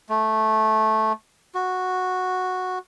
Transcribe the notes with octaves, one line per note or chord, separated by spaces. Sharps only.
A3
F#4